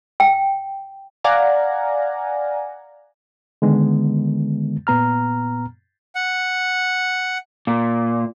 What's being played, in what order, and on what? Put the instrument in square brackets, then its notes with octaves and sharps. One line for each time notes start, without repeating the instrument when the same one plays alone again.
[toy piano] G5
[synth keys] D5 F5 F#5 G#5 A#5
[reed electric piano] D3 D#3 G#3 B3
A#2 B3 A#5 F6
[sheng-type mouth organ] F#5
[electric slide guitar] A#2